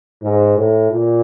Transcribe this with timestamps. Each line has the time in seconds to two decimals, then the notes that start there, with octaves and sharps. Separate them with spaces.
0.22 G#2
0.57 A2
0.91 A#2